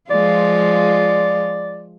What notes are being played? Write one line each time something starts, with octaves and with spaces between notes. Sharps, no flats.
F3 G#3 F4 D5